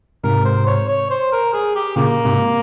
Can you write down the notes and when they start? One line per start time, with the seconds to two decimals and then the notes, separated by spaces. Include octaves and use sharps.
0.24 G#2 C3 A#4
0.45 C5
0.66 C#5
0.88 C#5
1.10 C5
1.32 A#4
1.53 G#4
1.75 G4
1.96 A#2 C#3 A#3
2.25 G#2 C3